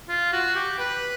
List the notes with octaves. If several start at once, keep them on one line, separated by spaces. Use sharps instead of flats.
F4
F#4
G4
B4